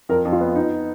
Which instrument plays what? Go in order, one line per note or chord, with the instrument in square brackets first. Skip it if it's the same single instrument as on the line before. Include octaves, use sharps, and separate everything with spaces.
[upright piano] F2 [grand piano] A#4
[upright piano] F2
[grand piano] F4
[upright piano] B3
D#4